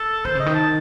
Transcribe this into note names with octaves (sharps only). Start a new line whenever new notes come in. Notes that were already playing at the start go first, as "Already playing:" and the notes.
Already playing: A4
D#3 C5
C#3 D#5
D#3
A5